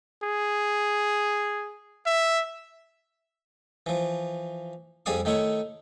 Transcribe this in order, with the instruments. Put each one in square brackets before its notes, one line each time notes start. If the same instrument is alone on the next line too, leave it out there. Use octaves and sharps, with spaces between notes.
[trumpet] G#4
E5
[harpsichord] E3 F3
F2 G3 G#4 D5 F5 D#6
D#3 A3 D#4 E4 C#5